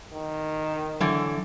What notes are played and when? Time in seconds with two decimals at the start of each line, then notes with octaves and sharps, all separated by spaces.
0.13 D#3
1.01 D3 E3 F#3